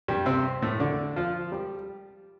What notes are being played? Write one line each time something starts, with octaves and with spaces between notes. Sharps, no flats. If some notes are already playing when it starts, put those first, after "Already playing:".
G2 G3
C3 C4
A2 A3
D3 D4
F3 F4
G3 G4